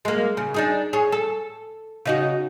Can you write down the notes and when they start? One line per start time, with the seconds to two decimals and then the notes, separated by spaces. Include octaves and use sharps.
0.05 G#3 A#3
0.37 C#3
0.54 D4 D#4 G#4
0.93 G#4 C#5
1.12 A4
2.05 C#3 D#4 F#4